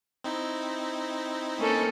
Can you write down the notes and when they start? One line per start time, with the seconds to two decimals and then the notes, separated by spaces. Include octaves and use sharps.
0.24 C4 D#4 E4
1.59 A#3 C#4 A4